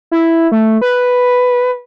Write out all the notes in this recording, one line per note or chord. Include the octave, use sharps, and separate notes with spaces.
E4
A3
B4